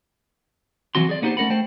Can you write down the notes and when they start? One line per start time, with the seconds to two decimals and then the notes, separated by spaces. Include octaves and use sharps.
0.95 E3 F#3 C4 F#4 C6
1.09 G#4 D5
1.22 A#3 B3 D#4 F#4 G4 C5
1.37 A3 C#4 A#4 F#5 B5
1.50 A3 C5 G5